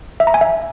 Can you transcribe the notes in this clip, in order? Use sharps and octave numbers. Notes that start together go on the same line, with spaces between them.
E5
A#5
G#5
E5